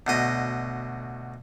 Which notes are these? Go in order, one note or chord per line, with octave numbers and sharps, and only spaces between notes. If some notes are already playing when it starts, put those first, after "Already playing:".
D2 B2 D#5